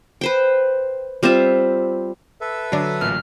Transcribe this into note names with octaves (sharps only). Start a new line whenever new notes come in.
B4 C5 G5
G3 C4 F4 E5
A4 B4 E5
D3 F#3 D4
A1 A#2 F#3 F6